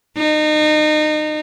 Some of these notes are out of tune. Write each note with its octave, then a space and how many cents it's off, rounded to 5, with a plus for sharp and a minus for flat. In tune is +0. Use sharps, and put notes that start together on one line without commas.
D#4 -30